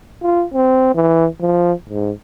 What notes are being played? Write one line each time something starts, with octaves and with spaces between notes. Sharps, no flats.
F4
C4
E3
F3
G#2